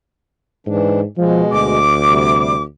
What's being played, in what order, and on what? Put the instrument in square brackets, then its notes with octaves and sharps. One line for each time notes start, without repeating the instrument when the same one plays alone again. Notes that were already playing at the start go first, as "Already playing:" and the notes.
[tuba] G#2 [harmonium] E3 D4
[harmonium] B2 G#3 [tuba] F3
[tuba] D2 [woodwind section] D6
[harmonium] C3 G3